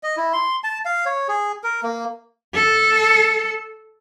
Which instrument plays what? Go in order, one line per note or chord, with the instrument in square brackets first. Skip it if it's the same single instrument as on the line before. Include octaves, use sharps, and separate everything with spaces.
[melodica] D#5
E4
C6
A5
F5
C#5
G#4
A#4
A#3
[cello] A4